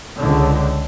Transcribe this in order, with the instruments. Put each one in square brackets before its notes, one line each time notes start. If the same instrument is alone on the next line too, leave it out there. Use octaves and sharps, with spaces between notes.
[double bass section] C#2 D3